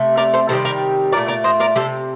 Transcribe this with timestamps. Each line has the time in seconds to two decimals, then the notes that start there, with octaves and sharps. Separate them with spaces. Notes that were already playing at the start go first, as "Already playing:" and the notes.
Already playing: C3 A3
0.17 A#4 D5
0.34 A4 C5
0.49 C3 D#3 G3 A4 C5
0.65 A#4 D5
1.12 A#2 A3 A#4 D5
1.28 A#4 D5
1.44 C5 D#5
1.60 A#4 D5
1.76 C3 G3 A4 C5